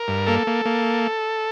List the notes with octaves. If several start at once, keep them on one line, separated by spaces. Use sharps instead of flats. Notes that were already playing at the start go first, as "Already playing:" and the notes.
Already playing: A#4
G2
A#3 A4
A#3
A#3